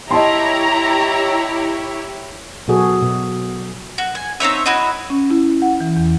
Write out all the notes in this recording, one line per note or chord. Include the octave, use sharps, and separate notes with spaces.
E4 G4 C#5 D#5 A5 A#5 C6
B2 F#3 F#4 G#4 A4
B2
F#4
G#5
C4 D#4 C#5 E5
E4 F#4 D#5
C#4
E4
F#5
E3
E2